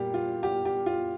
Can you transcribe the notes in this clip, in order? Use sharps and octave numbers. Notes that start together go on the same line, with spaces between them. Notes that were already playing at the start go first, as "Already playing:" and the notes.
Already playing: A#2 G3 A#3 G4
F4
G4
G4
F4